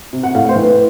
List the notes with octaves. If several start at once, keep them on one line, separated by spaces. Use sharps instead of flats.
C3
F#5
A2 F5
C5
E3
B4